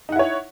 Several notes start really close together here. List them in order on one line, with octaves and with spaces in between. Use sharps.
D#4 F#5 E4 C#5